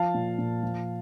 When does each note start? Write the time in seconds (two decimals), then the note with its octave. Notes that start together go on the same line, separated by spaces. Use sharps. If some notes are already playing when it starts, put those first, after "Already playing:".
Already playing: F3 F5 A5
0.14 A#2
0.38 A#2
0.63 F3